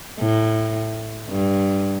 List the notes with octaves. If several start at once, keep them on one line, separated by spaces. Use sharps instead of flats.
A2
G2